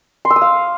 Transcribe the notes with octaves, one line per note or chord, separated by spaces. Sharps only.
C6
E6
D#6
F5